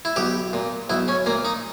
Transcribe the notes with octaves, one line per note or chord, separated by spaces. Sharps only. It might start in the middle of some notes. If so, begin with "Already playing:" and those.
E4
B1 G4
A#2
B1 E4
C#4
A#2 A#3
D#4